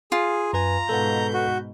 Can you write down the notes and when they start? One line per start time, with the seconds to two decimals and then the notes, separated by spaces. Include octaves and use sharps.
0.12 F4 G#4
0.53 F#2 B4 G#5 A#5
0.89 G#2 B2 A4 B4 F#5 G6
1.33 F#4